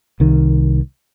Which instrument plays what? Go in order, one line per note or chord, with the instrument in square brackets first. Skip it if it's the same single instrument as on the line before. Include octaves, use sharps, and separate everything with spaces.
[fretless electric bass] C2 D#3